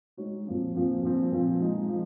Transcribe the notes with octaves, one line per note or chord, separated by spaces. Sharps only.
G#3 D#4 F#4 C#5
A#2 F3 C4
A#2 F3 C4
A#2 F3 C4
A#2 F3 C4
F3 G#3 D#4
F3